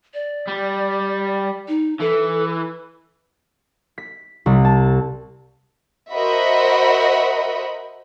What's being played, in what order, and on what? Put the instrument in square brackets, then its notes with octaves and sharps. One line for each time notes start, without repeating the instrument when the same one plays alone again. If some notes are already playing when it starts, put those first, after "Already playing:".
[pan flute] D5
[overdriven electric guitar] G3
[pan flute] D#4
[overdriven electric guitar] E3 [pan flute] A4
[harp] B6
C2
A5
[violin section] F#4 A#4 C5 D#5 E5 B5